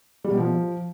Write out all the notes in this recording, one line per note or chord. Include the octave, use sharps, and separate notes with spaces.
G3
B2
F3